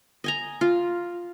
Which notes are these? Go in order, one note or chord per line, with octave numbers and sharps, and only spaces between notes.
D#5 G#5 A#5
F4